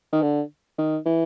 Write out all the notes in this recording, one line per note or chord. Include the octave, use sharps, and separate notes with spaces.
D#3
D3
D#3
E3